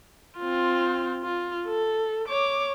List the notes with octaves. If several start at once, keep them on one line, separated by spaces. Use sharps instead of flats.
C4 F4
F4
A4
C#5 D6